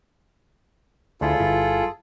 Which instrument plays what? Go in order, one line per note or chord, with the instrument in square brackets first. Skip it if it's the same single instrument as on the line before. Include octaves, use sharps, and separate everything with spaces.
[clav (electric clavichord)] D2 E4 [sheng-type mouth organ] F4 G#4 A4
[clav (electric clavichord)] G1 E4